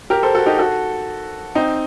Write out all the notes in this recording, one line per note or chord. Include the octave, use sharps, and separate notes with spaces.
G4 A#4
A4 C5
F#4 A4
D#4 G4
F#4 A4
C4 D#4